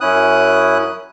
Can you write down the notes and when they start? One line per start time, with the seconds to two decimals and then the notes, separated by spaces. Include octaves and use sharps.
0.01 F#2 C#4 E4 D#6 F#6